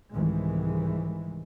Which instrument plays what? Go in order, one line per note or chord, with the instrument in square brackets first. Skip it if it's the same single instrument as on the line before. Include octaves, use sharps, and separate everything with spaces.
[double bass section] C2 G#2 D#3 E3 G#3